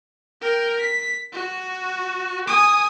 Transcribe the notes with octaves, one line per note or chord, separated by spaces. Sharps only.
A#4 G5
B6
F#4
G#5 D#6